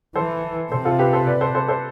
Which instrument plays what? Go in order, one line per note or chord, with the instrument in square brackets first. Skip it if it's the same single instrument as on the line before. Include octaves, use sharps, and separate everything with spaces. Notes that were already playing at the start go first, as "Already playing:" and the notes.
[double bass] E3 [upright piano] A4 C5
[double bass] C3 [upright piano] A4 C5
[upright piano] F4 A4
G4 B4
A4 C5
B4 D5
A4 C5
A4 C5
A4 C5